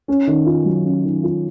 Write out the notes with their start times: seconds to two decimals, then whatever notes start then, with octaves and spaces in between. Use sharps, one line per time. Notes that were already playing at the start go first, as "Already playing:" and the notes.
0.08 C#4
0.27 D#3
0.46 F4
0.65 F#3
0.84 C#4
1.04 D#3
1.23 F4